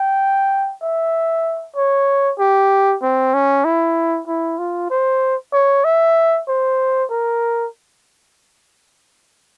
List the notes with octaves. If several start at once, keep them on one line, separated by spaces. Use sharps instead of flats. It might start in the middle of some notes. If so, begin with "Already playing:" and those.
Already playing: G5
E5
C#5
G4
C4
C#4
E4
E4
F4
C5
C#5
E5
C5
A#4